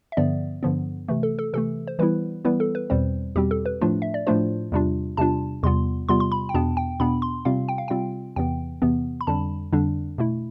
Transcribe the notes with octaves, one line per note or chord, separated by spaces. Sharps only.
E5
G2 D3 F3 B3 D5
G2 D3 F3 B3
C3 E3 A3
A4
A4
C3 E3 A3 A4
C5
E3 G3 B3 E4 B4
E3 G3 B3 E4 B4
A4
B4
E2 B2 G3 C4 C5
E2 B2 G3 C4 G4
A4
B4
A2 F3 A3 D4 F4
E5
D5
A2 F3 A3 D4 F4 C5
E2 C3 G3 D4 F4
E2 C3 G3 D4 F4 A5
E2 C3 G3 B3 F4 C6
E2 C3 G3 B3 F4 C6
C6
B5
G5
E2 B2 B3 D4 A5
G5
E2 B2 B3 D4 B5
C6
C3 G3 C4 F4 F5
G5
F5
C3 G3 C4 F4 G5
E2 C3 E3 B3 G5
E2 C3 E3 B3
B5
F2 D3 G3 D4 A5
F2 D3 G3 D4
B2 A3 E4